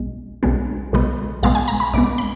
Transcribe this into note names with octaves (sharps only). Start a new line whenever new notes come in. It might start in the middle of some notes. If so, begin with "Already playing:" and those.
Already playing: B1 B2 G#3
B1 B2 G#3 B3
B1 B2 G#3 B3
B1 B2 G#3 B3 F5
G#5
A#5
B5
B1 B2 G#3 B3 D6
B5